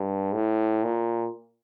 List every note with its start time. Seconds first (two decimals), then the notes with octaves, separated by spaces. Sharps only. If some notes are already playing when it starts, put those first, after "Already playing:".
Already playing: G2
0.34 A2
0.84 A#2